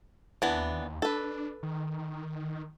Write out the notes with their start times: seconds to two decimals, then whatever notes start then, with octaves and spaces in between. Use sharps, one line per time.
0.42 D#2 E3 B3 D4
1.02 D4 A4 B4
1.63 D#3